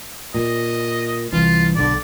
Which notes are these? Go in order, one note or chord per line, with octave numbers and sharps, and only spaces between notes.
A#2 D#5
C2 E3 F4
B1 D3 D5